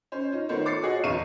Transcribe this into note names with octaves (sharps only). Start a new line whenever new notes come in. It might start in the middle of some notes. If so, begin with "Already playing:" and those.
C#4 C5
D#4 F4
D#3 A3 B3 F4 C5 C#5
D6 A6 C7 C#7
F4 F#4 G#4 C#5 D#5
G1 E2 F5 C#6 D#7